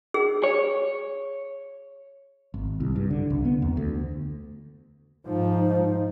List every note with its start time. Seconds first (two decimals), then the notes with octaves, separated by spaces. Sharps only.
0.14 G#4
0.44 C#5
2.54 G#1
2.80 C2
2.96 G2
3.10 D3
3.30 C2
3.45 B3
3.62 E2
3.77 D2
5.27 G#2 F3 D#4